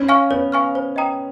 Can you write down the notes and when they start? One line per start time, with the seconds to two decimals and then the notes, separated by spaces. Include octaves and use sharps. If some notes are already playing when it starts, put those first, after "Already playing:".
Already playing: C#4
0.09 F5 G#5 C#6 F6
0.31 B3 C#5
0.52 F5 G#5 C#6 F6
0.75 C5
0.96 D#5 G5 A#5 D#6